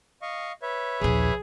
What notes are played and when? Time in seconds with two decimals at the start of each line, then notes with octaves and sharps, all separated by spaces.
0.22 D#5 F5 C#6
0.62 B4 C#5 E5
1.01 A#1 D#2 G#4